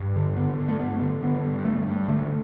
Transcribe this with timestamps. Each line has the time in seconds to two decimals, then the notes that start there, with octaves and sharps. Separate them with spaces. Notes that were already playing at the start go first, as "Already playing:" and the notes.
Already playing: G2
0.16 D3
0.36 D3 B3
0.59 D3
0.68 A3
0.79 G2 B3
1.01 D3
1.22 D3 B3
1.44 G2
1.65 G2 A3
1.87 G2
2.08 D3 A3